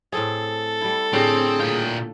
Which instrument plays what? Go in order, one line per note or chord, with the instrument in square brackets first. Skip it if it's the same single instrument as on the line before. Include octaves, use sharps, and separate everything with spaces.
[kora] A2 C4 G#4 [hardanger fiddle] A4
[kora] G3 E4
[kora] A2 D3 G4 [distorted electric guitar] C4 [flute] G#4
[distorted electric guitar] A#2 G5 [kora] F5